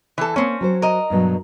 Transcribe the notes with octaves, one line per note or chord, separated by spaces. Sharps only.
E3 A4
A#3 C4 C#4
F#3 B4 C5
A#4 D#5
G2 B2 F#3